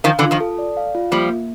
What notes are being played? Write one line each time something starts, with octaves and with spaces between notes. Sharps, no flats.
D#3 F3 F5
D3 E3
F4
D#3 F3
A4
D5
F5
F4
F3 G3 A#3
A#3